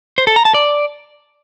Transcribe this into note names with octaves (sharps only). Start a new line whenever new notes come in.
C5
A4
A#5
A5
D5